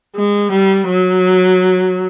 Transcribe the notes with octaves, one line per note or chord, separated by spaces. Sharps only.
G#3
G3
F#3